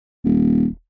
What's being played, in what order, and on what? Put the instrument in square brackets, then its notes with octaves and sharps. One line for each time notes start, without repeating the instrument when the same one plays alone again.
[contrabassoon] D#1